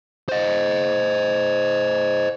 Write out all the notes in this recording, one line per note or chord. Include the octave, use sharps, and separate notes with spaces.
C5 D#5